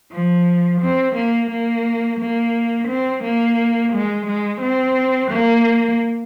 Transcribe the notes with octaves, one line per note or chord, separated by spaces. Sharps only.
F3
C4
A#3
A#3
A#3
C4
A#3
G#3
G#3
C4
A#3